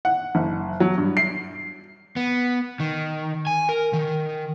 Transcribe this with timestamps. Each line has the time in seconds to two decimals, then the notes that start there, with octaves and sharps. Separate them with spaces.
0.05 F#5
0.35 F#1
0.80 F#3
0.98 G2
1.17 C7
2.16 B3
2.80 D#3
3.47 G#5
3.69 A#4
3.93 D#3